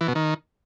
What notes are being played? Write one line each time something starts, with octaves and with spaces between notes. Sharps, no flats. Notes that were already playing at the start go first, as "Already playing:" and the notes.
E3
B2
D#3